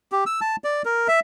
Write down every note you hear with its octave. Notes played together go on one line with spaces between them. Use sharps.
G4
E6
A5
D5
A#4
E5